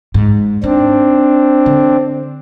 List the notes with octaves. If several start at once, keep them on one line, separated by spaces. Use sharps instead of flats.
G#2
C4 D4 D#4
D3